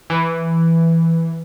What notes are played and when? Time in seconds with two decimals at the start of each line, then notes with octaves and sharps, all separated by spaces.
0.10 E3